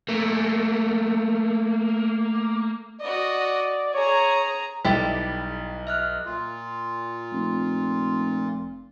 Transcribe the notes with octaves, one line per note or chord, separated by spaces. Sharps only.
A3 A#3
F#4 D5 D#5
G#4 C#5 A#5
B1 G3 E4 G4 A4 A6 B6
E5 F6 F#6
A#2 F4
F1